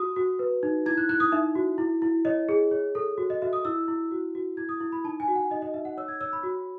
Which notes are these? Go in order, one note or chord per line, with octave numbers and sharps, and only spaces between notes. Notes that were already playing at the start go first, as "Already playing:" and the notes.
Already playing: F#4 D#6
F#4
B4
D#4
E4 G#6
F#6
E4 F#6
D#6
D#4 E5
F#4
E4
E4
C#5 D#5
G#4
C#5
A4
F#4
D#5
F#4 E5
D#6
E4 E6
E4
F#4
F#4
E4 G#6
D#6
E4
B5
D#4 A5
G#5
F#4
F#5
D#4 D#5
D#5
D#4 E5
F#5
C#5 E6
G#6
C#5 E6
B5
F#4